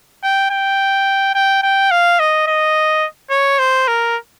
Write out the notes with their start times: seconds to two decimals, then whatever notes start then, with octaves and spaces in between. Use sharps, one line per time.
0.23 G5
0.50 G5
1.35 G5
1.63 G5
1.91 F5
2.19 D#5
2.47 D#5
3.30 C#5
3.59 C5
3.88 A#4